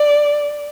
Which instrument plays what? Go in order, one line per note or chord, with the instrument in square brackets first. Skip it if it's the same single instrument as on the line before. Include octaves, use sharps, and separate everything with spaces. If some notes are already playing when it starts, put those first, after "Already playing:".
Already playing: [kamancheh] D5